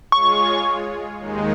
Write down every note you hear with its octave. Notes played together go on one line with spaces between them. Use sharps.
G#3 F4 G#4 C#5 C#6
D#2 D#3 G#3 D#4